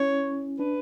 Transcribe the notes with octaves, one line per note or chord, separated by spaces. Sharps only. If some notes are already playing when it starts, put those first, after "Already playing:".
Already playing: C#4 E4 C#5
D4 B4